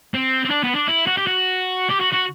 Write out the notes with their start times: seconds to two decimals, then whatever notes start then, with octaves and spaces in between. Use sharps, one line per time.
0.14 C4
0.45 C4
0.51 D4
0.64 B3
0.75 D4
0.88 E4
1.07 F#4
1.18 G4
1.27 F#4
1.90 G4
2.00 F#4
2.12 F#4